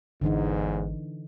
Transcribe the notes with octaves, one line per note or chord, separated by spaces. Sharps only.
G#1 E2 G#2 D3 E3 D#4